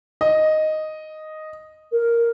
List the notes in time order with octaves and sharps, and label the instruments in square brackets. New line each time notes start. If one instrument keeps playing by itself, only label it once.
[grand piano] D#5
[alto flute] A#4